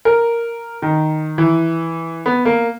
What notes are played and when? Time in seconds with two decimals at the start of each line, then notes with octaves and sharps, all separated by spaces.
0.05 A#4
0.82 D#3
1.38 E3
2.26 B3
2.45 A#3